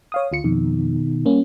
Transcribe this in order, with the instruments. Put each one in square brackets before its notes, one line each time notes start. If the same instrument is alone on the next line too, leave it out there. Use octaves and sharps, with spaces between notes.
[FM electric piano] C#5 F5 D#6
D2 F4 C#7
[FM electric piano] F2 [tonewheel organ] B2 D#3
[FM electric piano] G3 A#3 C#4